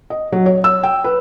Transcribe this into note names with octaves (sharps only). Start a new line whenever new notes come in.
D#5
F#3
C#5
E6
G5
B4